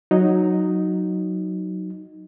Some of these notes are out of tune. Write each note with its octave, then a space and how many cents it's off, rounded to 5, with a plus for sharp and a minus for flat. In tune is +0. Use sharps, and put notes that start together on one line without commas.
F#3 -5 D#4 +0